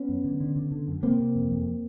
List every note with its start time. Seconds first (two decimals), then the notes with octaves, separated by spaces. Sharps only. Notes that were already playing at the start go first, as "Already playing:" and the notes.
Already playing: B3 C#4
0.09 F#2
0.24 D3
0.40 D3
0.56 D3
0.72 D3
0.88 F#2
1.03 C3 A#3 C4
1.19 C3
1.35 F2
1.51 F2